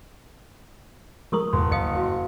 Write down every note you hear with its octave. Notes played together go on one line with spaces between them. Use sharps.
F3 G#3 A4 A#4 C#6 D#6
F#1 C6
D2 D#5 F5 D#6 C#7
F#4 F5